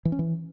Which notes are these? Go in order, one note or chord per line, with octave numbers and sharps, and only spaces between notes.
E3
C#4
E3